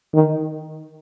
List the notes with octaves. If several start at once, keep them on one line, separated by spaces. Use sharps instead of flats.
D#3